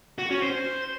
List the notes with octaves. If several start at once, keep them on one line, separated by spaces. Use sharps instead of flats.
F#4
C#4
C5